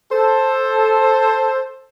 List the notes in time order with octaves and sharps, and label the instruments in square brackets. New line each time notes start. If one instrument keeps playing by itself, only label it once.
[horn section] A4 C5